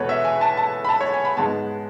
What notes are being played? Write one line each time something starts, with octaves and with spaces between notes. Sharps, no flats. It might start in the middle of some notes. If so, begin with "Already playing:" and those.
Already playing: E2 B2 G#3 B3 A4 B4 C#5
E5
G#5
A5
A5
B5
A5
C#5
G#5
B5
G#2 G#3 B3 A5